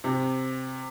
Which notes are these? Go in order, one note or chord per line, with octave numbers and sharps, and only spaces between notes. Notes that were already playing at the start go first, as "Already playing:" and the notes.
C3